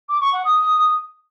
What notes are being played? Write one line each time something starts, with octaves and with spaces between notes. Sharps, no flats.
D6
C#6
F#5
D#6